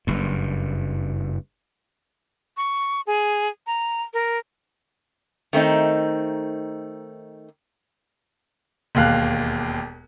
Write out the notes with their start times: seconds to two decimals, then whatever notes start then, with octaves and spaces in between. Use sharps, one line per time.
0.07 F#1 G2
2.57 C#6
3.07 G#4
3.67 A#5
4.14 A#4
5.53 D#3 A3 C4 D#4
8.95 E1 D#2 F5 F#6